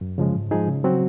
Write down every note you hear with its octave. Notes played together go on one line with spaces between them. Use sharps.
F#2
C#3 F3 G#3
G#2
F3 G#3 D#4 G#4
C#3
F#3 C4 F#4